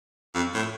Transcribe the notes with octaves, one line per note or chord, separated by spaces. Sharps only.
F2
A2